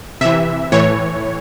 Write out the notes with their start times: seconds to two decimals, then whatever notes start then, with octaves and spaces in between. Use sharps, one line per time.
0.21 C3 E3 E5
0.72 A2 E3 C#5